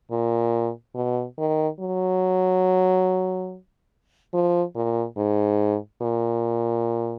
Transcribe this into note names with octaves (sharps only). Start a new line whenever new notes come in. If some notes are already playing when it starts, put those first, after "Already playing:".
A#2
B2
D#3
F#3
F3
A#2
G#2
A#2